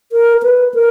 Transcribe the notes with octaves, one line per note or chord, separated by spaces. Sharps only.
A#4
B4
A#4